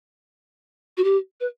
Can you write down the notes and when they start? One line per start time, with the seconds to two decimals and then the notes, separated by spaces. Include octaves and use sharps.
0.97 F#4
1.04 G4
1.40 B4